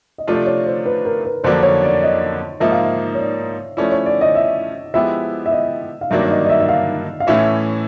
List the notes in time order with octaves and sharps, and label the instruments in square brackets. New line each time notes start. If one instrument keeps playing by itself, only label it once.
[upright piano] D#5
[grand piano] C3 F3 A3 D4 F4 [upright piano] D5
[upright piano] C#5
C5
B4
A#4
B4
[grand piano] F2 D3 F#3 A#3 D4 [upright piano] C5
[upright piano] C#5
D5
D#5
[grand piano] G#2 F3 A#3 D#4 [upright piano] E5
[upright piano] F5
E5
C#5
D5
[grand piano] F3 A3 C#4 E4 [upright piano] D5
[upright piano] C#5
D5
D#5
E5
[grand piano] F3 G#3 B3 E4 G4 [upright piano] E5
[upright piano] E5
D#5
F5
[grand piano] G2 D#3 F#3 A#3 D4 [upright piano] E5
[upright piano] D5
D#5
D#5
E5
E5
F5
F5
[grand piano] A2 E3 A3 C#4 E4 [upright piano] E5